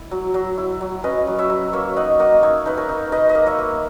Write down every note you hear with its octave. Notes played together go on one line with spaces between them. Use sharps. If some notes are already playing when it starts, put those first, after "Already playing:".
Already playing: E4
F#3
F#3
E4
F#3
C#4 B4 D#5
F#3
C#5 E5
F#3
A#3 C#5 E5
D#4 D#5 F#5
A#3 D#5 F#5
D#4 C#5 E5
D#4 B4
A#4 C#5
D#4
D#4 B4 D#5
B4 D#5
A#3
C#5 E5
A#3